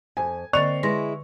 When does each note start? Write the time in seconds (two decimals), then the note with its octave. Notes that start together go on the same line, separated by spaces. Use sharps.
0.17 F2 G#5
0.53 D3 A#3 C4 D5 D#5 C#6 A6 F7
0.83 G#3 E4 B4 C6 A#6